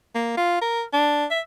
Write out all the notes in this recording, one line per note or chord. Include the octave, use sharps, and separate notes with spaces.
A#3
F4
A#4
D4
E5